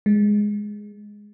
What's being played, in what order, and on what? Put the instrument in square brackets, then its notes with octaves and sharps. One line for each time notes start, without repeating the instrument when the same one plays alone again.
[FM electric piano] G#3